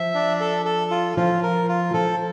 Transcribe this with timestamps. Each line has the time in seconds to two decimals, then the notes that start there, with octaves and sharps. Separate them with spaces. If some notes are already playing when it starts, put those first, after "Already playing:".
Already playing: F3 E5
0.14 D4
0.41 A4
0.65 A4
0.91 F4
1.17 F3 F4
1.43 A#4
1.69 F4
1.94 F3 A4